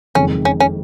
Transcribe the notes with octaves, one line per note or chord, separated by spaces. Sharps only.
F#1 F2 D#3 G#3 C#4
C#4
C#4